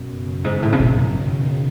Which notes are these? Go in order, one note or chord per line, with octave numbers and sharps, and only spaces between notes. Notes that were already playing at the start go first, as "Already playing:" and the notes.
Already playing: F#2 B2
C#3
G#2 D#3
A2
C#3
B2
F#2